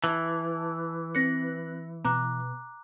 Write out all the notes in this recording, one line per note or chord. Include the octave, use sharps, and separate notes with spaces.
E3 A5 F#6
C4 B4 F#6 A#6 C#7
B2 B3 A#5 D6 F#6